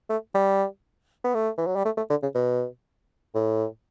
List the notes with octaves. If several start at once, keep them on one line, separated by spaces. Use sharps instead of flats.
A3
G3
B3
A3
E3
F#3
G3
A3
A3
D3
C#3
B2
A2